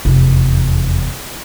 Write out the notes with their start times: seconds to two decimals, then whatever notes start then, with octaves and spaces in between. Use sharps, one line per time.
0.05 F1 E2